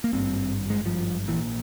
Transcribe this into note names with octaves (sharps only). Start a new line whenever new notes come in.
A#3
G#1 G2 C4
G#3
F3
A#1 A#2 E3